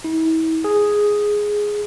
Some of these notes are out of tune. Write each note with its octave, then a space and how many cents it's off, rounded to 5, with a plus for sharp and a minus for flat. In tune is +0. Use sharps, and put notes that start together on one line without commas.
E4 -40
G#4 +0